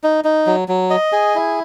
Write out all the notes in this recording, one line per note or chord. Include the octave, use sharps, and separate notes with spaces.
D#4
D#4
F#3
F#3
D#5
G#4
E4